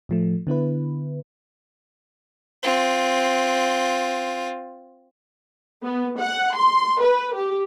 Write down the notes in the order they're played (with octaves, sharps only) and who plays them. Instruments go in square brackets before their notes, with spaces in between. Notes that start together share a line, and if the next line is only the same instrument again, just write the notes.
[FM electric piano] A2 F3 A3
D3 B3 E4 B4
[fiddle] C4 F4
[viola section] B3
F#5
C6
B4
G4